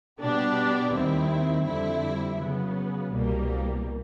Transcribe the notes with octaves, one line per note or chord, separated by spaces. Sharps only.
B2 G3 B3 D4 G4
D#2 D#3 G3 C4 E4
F2 D3 G3 C4 E4
C#3 F#3 B3
C2 B2 G3 A#3